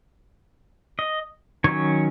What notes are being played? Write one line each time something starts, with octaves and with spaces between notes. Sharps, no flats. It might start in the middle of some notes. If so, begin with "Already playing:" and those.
D#5
D#3 F#3 C#4 C#5